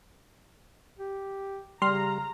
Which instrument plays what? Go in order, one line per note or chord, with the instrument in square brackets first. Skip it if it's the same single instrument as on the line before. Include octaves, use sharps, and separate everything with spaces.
[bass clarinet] G4
[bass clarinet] C#3 [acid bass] G3 [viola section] A#5 [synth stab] C6 F6